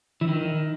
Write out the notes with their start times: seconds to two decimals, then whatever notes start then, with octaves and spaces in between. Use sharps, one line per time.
0.21 E3
0.28 D#3